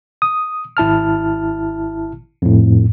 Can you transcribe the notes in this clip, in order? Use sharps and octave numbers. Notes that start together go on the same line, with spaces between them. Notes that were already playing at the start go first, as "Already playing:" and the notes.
D#6
G#1 E4 A5 F6
F2 A2